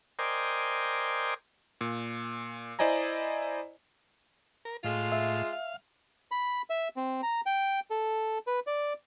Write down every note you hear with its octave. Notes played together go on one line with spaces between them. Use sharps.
A#4 C5 D5 D#5 G5 G#5
A#2
E4 C5 D5 D#5 G#5 A#5
A#4
A2 G#3 F4
E5
F5
B5
E5
C4
A#5
G5
A4
B4
D5